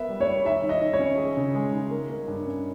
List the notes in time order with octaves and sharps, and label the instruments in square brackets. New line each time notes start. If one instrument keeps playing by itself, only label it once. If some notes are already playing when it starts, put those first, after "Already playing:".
Already playing: [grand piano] B3 A#4 [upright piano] E5
[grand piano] G3
[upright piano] C#5
[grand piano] G3
[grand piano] D#3 [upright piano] E5
[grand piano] D#3
[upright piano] D#5
[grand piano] D#3
[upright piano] C#5
[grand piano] C#4
G#4
C#3
G#3
D#4
A#3
A#3
G2
C#4